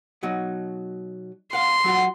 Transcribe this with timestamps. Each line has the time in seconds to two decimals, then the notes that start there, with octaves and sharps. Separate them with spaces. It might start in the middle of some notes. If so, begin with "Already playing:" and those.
0.23 B2 F#3 D#4
1.53 F5 F#5 C6
1.84 F#3 F4 F#4